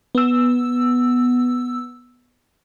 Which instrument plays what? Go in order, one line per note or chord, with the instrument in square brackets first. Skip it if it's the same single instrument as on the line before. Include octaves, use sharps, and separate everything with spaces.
[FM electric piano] B3 E6